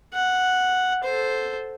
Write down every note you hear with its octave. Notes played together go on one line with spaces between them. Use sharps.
F#5
A4 C5